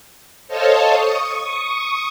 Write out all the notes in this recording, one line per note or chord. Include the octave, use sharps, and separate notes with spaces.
A4 C5 C#5 D#5 F5 A5
C#6 D#6